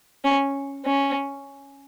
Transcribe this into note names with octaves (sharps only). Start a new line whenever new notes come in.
C#4
C#4